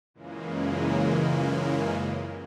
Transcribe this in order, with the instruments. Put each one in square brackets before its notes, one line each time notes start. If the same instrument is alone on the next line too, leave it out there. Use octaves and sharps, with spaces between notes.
[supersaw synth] F#2 A#2 C#3 E3 G#3 A#3